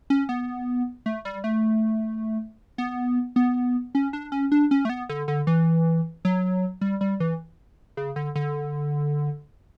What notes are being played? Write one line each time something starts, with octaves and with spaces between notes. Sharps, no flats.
C#4
B3
A3
G3
A3
B3
B3
C#4
D4
C#4
D4
C#4
A3
B3
D3
D3
E3
F#3
G3
G3
E3
C#3
D3
D3